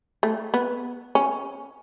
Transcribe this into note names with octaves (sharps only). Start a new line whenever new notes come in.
A3
B3
C#4